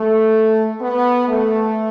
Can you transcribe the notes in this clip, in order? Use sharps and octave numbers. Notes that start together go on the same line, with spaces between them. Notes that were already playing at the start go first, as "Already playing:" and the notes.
Already playing: A3
B3
A3